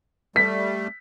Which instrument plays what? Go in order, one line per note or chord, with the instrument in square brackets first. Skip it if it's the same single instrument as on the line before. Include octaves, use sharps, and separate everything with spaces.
[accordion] G3 A3 [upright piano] B6